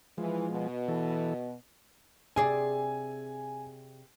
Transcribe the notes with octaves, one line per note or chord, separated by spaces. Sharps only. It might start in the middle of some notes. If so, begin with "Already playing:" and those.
E3 F3 G#3
B2
E3 A4
C3 G#4 D5 G#5